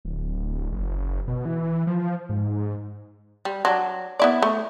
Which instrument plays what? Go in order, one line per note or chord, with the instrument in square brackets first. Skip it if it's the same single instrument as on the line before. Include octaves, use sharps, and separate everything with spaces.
[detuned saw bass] D1
F#1
B2
E3
F3
G#2
[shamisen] G3
F#3 D4
B3 E4 D5
A3